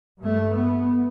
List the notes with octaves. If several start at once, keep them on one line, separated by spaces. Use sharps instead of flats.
G2 A3
B3